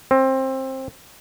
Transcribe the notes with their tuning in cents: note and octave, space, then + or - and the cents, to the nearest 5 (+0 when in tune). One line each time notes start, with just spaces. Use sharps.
C4 +20